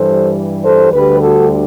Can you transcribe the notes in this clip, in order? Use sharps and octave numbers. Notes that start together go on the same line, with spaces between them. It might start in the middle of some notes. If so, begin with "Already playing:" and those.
Already playing: G2 E3 G3 A4 C5
A4 C5
D2 D3 G3 G4 B4
F#4 A4